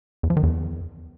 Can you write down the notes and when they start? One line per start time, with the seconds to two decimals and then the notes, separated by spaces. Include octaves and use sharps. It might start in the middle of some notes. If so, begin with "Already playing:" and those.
0.23 E2
0.30 F3
0.37 D#3
0.43 E2